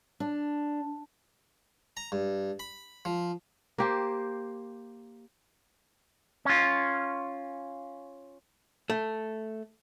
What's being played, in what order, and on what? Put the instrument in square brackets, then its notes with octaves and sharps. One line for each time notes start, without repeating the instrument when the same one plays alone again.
[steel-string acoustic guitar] D4
[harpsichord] A#5
G2
B5
F3
[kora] A#3 G4 C5
[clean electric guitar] C#4 F4
[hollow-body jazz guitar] A3